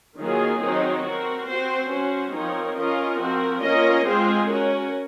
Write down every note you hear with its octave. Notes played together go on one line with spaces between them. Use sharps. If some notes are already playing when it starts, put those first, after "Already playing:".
D#3 F#3 A#3 F4 G#4
D#3 F#3 C4 D#4
C4 F#4 A#4
C4 F#4 C5
F#3 C#4 F#4 C5
F3 C4 D#4 A#4 C#5
C#4 F4 A#4 D#5
F3 C4 F#4 A#4
A#3 C#4 F4 A#4 D#5
G#3 C4 F4 G#4 C5
C#4 F#4 A#4 C#5